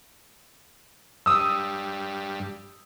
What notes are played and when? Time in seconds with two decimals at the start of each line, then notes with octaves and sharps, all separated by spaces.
1.26 G2 D#6 E6